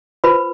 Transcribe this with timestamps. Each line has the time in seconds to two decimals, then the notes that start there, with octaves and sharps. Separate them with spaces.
0.24 F4 B4 C5 B5